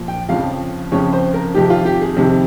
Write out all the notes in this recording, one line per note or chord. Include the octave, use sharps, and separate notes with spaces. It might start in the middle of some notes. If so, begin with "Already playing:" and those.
Already playing: A#2 F3
G5
F2 C#3 F3 F5
F2 C#3 F3 C#5
C5
A#4
F2 C3 D#3 G4
F4
G4
G#4
F2 C3 D#3